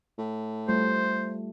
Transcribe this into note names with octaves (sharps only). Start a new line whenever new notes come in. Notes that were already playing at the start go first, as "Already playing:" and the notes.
A2
G3 A3 F4 C5